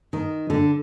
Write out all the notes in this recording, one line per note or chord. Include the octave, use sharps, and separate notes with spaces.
D#3
D3